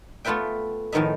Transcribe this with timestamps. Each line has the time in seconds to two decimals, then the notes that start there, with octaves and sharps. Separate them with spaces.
0.25 A3 B3 F4 B4 E5 G5
0.92 F2 A2 D#3 B3 D#4 E5